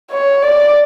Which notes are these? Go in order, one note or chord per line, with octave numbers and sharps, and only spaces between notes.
C#5
D5